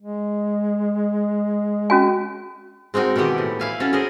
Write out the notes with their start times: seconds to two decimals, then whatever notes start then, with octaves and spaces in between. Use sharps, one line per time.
0.01 G#3
1.90 C#4 F#4 G#5
2.94 G#3 C4 D#4 F#4 A#4
3.16 B2 D#3 E3 G4 F#5
3.38 A2
3.60 E4 F5 G#5
3.80 C#4 F#4 A4
3.93 G#4 A#4 C5 D#5